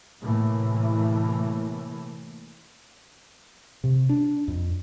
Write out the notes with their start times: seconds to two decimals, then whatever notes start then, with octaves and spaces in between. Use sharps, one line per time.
0.23 A2 C3 E3 A3 A#3
3.84 C3
4.09 D4
4.48 F2